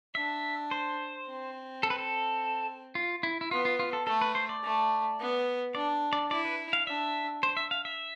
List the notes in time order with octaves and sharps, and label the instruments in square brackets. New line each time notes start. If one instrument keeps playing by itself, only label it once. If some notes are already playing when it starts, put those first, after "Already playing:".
[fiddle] D4 [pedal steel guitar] E5
[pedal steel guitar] C5
[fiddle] C4
[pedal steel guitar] A4
B4
A4
F4
E4
E4
[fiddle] B3 [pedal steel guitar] F4
[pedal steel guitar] F4
F4
A4
[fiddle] A3 [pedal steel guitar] A4
[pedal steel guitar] B4
C5
D5
[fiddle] A3
B3
[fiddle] D4 [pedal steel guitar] D5
[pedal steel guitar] D5
[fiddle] E4 [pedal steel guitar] D5
[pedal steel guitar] B4
F5
[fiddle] D4 [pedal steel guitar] E5
[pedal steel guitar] C5
E5
F5
E5